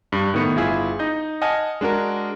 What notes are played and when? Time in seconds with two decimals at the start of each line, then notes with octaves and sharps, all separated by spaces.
0.12 G2
0.34 A2 D#3 B3 C#7
0.55 G1 E4 F4 G#4 E5
0.99 D#4 D#5 G6
1.42 D#5 F#5 G#5 A5 F6
1.81 G#3 D4 F#4 A#4